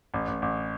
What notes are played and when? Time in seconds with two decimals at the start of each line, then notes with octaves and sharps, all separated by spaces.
0.14 A1
0.28 A1
0.42 A1